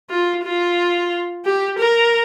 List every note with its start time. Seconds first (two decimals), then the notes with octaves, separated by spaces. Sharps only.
0.10 F4
0.45 F4
1.45 G4
1.79 A#4